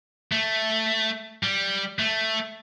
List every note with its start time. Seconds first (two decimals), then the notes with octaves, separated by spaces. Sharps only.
0.32 A3
1.43 G3
1.99 A3